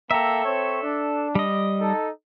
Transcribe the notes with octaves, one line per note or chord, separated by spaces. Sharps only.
A#3 A4 E5 G5 A#5
C4 C#5
D4
G3 D#5
D#4 A4